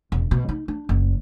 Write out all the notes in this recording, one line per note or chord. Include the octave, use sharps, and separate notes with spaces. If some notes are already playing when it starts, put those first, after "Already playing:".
E1
B2
D#4
D4
F#1